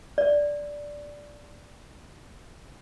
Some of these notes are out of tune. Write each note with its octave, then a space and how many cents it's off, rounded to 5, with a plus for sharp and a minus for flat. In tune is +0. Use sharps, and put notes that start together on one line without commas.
D5 -5